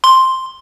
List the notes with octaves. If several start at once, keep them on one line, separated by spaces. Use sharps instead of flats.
C6